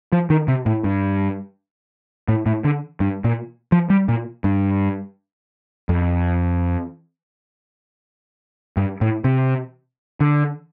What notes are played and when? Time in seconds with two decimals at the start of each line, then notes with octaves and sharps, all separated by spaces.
0.12 F3
0.30 D#3
0.48 C3
0.66 A2
0.84 G2
2.28 A2
2.46 A2
2.64 D3
3.00 G2
3.24 A#2
3.72 F3
3.90 G3
4.09 A#2
4.44 G2
5.89 F2
8.77 G2
9.01 A2
9.24 C3
10.20 D3